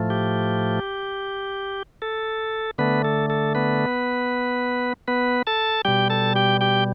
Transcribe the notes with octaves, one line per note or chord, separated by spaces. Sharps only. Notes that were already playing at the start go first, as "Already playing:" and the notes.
Already playing: A2 F3 A3
G4
A4
D3 A3 B3 B4
A4
A4
B3 B4
B3 B4
A4 A5
B2 G3 G4 G5
A4 A5
G4 G5
G4 G5